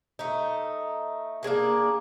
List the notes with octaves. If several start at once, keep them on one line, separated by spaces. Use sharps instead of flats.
A3 D#4
A#3 D4 G#4 A#4